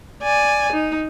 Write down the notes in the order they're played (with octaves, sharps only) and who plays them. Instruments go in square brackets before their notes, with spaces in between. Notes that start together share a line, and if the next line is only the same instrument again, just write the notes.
[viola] D5 G#5
D#4